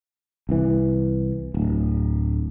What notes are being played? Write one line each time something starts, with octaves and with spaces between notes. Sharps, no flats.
C2 E3
D1